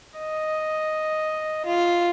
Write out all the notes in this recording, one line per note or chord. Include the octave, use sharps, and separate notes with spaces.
D#5
F4